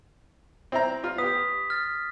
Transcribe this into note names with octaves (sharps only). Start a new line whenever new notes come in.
C4 E4 A#5
F4
B3 G4 D#6 B6
F6 A6